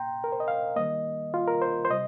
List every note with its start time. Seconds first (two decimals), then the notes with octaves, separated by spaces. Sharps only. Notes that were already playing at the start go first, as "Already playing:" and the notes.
Already playing: A#2 A#3 G5 A#5 C6
0.24 A#4
0.32 C5
0.40 D#5
0.48 F5
0.76 D#3 G3 A#3 D#5
1.34 F4
1.48 A#4
1.62 C5
1.85 C5
1.90 C3 G3 D#5